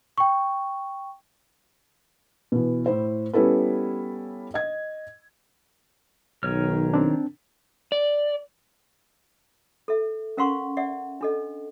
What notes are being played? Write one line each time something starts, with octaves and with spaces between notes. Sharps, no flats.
G5 C#6
B2 E3
A2 E4 C5
G3 B3 C#4 E4 A4 B4
D#5 G#6
B1 D#3 C#5 F6
C4 D4
D5
A4 E5
C#4 A#4 F5 F#5 C6 C#6
D5 E5 F#5
D4 A4 D#5